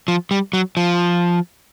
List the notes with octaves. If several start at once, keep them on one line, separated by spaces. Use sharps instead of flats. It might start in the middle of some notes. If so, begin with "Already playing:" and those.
F3
G3
F#3
F3